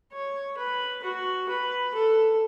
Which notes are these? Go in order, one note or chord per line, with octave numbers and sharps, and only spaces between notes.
C#5
B4
F#4
B4
A4